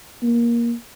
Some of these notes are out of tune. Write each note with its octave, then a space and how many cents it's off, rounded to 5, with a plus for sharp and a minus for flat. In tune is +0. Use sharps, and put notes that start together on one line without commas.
A#3 +15